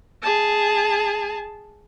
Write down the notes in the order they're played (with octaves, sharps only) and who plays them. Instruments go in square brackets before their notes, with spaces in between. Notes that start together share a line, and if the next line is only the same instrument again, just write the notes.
[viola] G#4 A5